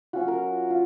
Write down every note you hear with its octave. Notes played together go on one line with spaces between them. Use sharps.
F#3 C#4 F4 F#4
A#4
F4